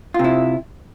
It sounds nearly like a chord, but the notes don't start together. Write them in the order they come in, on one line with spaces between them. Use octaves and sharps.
F4 C3 E4